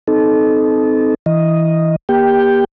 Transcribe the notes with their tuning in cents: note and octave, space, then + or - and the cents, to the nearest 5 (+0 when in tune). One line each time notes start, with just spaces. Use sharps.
C4 -20 D#4 +0 A4 -25
E3 -5 D#5 +0
A#3 +35 G4 +20 G5 +0